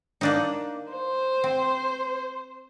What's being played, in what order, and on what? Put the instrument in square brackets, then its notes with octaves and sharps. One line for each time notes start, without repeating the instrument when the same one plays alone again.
[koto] A#3 D4 D#4
[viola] C5
[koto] C4